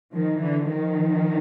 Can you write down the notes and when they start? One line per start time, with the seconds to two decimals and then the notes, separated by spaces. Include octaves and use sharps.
0.13 D#3 F3
0.41 D3 E3
0.69 D#3 F3